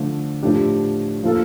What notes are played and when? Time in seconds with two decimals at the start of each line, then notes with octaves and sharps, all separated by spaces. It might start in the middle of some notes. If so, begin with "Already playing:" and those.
Already playing: D3 F3 A3
0.43 A2 F3 A3 D4 G4
1.23 F3 A#3 F4 A4